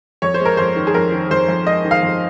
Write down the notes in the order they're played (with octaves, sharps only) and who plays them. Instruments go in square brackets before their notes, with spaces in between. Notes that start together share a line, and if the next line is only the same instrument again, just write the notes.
[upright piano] F2 C#5
C5
G#3
A#4
F2 C5
D#3
G#4
F2 A#4
D#3
F2 C5
F2
G#3 D#5
D#3
F5
F2